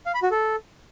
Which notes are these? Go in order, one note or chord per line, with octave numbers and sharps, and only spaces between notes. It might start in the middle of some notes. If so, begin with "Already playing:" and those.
F5
B5
F#4
A4